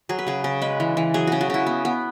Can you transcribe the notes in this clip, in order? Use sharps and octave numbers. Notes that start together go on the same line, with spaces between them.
F#3 G#4
B4
C#3 G#4
C#3
G#3 B4
E3
E3
F#3 G#4
C#3 F#4
F#4
C#3 E4
B3
B3